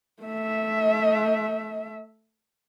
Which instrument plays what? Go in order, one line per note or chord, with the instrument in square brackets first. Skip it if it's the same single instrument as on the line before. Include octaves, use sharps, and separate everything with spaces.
[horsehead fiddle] A3 E5